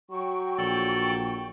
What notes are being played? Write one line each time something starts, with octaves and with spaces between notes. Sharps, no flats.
F#3 G5 C#6
A#1 A4 D5